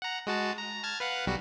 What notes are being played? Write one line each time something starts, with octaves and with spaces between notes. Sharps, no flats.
F#5 A#5
G#3 F#4 A5
A#5
A5 F6 G#6
B4 F5 F#5
B1 G3 F#4